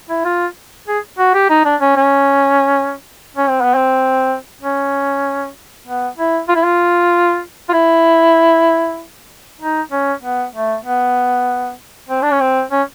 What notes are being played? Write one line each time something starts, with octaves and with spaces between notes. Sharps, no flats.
E4
F4
G#4
F#4
G4
D#4
D4
C#4
C#4
C#4
C4
B3
C4
C#4
B3
E4
F4
E4
F4
F4
E4
D#4
C#4
B3
A3
B3
C4
D4
C#4
C4
C#4